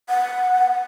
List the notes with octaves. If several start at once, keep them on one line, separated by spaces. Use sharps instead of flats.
F#5